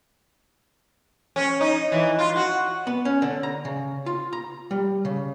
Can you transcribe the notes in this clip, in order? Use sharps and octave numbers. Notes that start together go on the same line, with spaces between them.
C#4
D#4
E3
F4
F#4
B3
C#4
D3
A#5
C#3
F4
A#5
G3
C#3